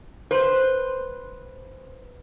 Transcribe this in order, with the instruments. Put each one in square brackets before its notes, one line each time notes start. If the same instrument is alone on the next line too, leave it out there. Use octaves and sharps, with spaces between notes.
[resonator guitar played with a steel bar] B4 C5